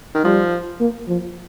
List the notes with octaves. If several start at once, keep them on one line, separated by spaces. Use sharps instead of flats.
D#3
F3 G3
A#3
F3